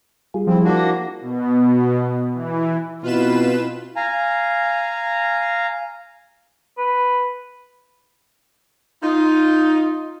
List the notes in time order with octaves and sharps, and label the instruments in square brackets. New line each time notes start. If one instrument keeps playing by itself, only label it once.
[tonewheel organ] G3 F4 G#4
[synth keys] F3 E4 [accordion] C4
[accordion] A#3 D4 F#4
[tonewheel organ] A#6
[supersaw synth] B2
E3
[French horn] B2 [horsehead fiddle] C4 E4 [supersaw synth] F4 B4 E7
[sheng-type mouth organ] F5 G#5 A#5
[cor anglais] B4
[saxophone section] D#4 [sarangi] F4